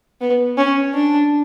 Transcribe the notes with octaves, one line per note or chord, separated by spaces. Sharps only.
B3
C#4
D4